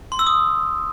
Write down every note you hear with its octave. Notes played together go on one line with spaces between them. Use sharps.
C6
E6
D#6